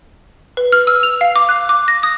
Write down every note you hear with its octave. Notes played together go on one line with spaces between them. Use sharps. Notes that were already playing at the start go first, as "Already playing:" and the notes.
B4
F6
E6
F7
F5
D6
F#6
D6
A#6
D#6